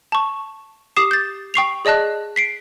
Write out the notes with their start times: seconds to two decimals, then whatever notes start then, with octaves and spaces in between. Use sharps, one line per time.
0.12 A5 C#6
0.96 G4 D6 D#6 C7 E7
1.11 G6 A6
1.54 G5 C#6 C7 F7
1.85 G#4 D5 D#5 A5 F#6
2.36 B6 C7 D7